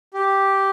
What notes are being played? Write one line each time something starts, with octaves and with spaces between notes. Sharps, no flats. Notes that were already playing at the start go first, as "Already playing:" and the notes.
G4